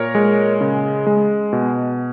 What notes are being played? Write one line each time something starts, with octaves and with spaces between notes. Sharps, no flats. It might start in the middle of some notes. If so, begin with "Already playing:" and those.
Already playing: A#2 A#4 C#5
G#3
C#3
G#3
B2